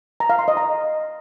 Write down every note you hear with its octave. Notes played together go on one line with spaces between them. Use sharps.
A#5
F5
C6
D#5
A#5